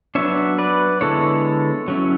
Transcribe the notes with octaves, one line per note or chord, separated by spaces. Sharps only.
F#3 B3 D4 C#5 E5
B4 D5
D3 G#3 B3 E4 A4 C#5
F#3 C#4 E4